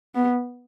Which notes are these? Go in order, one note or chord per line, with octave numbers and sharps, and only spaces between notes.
B3